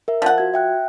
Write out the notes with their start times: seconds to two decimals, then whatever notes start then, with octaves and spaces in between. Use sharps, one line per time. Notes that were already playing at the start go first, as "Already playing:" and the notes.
0.08 A#4 E5
0.22 F3 F#5
0.38 F#4 G#6
0.54 E5 G5 F#6